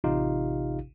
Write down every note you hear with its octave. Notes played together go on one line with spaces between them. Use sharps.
A1 C3 D#4 F4 G4 F5